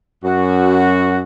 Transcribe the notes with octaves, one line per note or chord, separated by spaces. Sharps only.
F#2 F#4